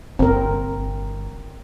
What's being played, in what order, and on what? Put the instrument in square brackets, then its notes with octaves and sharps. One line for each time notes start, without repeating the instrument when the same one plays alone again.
[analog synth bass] G1 [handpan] C4 A#4